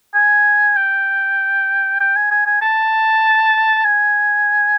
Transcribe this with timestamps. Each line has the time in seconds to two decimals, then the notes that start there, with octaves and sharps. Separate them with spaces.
0.14 G#5
0.76 G5
2.00 G5
2.16 G#5
2.31 G#5
2.46 G#5
2.61 A5
3.85 G#5